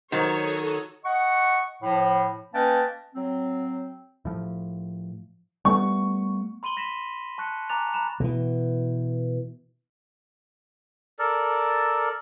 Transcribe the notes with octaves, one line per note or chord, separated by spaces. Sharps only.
D#3 F#3 F#4 A4 C5 C#5 D#6
D#5 F#5 C#6
A2 F3
A#3 C#4 B4 D#5 G5 A5
F#3 C4
A2 F3
G3 A3 B3 C#6
B5 C6 D#7 F#7 G7
C6 A#6 B6 E7
A5 C#6 F#6 A#6 C#7
G#5 A#5 D6 F#6 A6 F7
A#5 B5 F#6 E7 F7
B2 E3
A4 A#4 D5